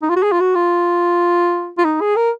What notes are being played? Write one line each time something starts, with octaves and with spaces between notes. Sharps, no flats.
D#4
F4
F#4
G#4
F4
F#4
F4
F4
D#4
G#4
A#4